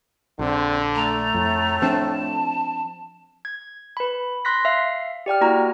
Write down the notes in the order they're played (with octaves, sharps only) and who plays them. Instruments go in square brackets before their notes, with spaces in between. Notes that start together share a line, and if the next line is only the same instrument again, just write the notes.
[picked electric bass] A#1 [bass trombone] D3 [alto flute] C4
[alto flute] A3 [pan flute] A#5
[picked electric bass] F2 [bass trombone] A2
[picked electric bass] F3 C4 D4 [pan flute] A5
[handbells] G#6
B4 B5
C6 F#6 A#6 B6
E5 F5 C7
G4 D5 G5 F6
A#3 E4 F#4 A#5